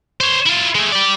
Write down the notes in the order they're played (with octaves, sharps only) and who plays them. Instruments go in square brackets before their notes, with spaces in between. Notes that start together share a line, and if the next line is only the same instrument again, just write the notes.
[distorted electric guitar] C5 C#5
E4 F4
G#3 A3
G4 D5